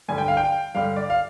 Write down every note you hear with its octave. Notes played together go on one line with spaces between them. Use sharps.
G2 D3 G3 G#5
G5
F5
G5
G2 D3 G3 F5
D5
F5